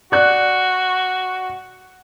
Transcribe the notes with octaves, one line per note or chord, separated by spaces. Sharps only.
F#4 D5 F#6